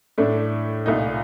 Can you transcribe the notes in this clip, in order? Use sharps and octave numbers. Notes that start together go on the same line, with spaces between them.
A2 A3 D4
C2 A#2 A3 D#4